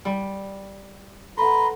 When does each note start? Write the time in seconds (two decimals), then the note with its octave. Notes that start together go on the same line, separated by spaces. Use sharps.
0.05 G3
1.37 A4 B4 F#5 A#5 C6